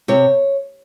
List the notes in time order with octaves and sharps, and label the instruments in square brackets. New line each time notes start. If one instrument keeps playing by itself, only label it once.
[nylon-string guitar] C3 C#5